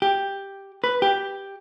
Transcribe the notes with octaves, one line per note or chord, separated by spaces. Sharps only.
G4
B4
G4